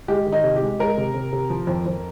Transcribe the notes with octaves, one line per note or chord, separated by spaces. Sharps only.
G#3 G4
D#3
D#4
C3
G4
G#3
G#3 A#4
C3
C3
C3
F3
F2
F2